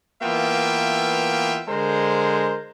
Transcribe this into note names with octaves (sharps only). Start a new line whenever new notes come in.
E3 A#3 B3 F4 E5 G5
D3 G#3 A#4 C5